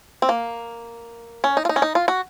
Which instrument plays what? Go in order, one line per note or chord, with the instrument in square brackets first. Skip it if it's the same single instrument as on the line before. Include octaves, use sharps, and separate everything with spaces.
[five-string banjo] C4
A#3
C#4
D#4
F4
D#4
C#4
D#4
F4
F#4